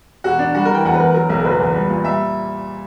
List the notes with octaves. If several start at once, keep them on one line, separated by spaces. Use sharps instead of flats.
E1 F#4
E1 D4
G3 F#4
A#4
E3 G5
E2 F#5
B4
E2 A#4
F#3 A#4
B1 A#4
F#1 B4
E2
G3
A#2
G3 E5